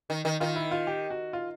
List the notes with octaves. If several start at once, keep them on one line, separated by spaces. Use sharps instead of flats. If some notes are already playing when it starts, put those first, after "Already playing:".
D#3
D#3
D#3 F4
E4
F4
G4
F#4
F4